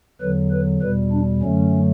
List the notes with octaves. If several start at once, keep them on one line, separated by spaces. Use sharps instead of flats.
E2 D3 F#3 B4
B4
E2 B2 G3 B4
D4
F#2 D3 F#3 A3 C#4